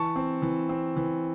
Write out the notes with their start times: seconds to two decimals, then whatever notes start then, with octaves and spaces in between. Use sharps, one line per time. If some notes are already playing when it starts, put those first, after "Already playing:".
Already playing: E3 A5 C#6
0.16 C4
0.42 E3
0.69 C4
0.96 E3